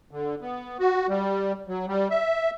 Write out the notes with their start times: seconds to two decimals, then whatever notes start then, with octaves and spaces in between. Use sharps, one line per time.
0.11 D3
0.41 B3
0.79 F#4
1.09 G3
1.68 F#3
1.87 G3
2.10 E5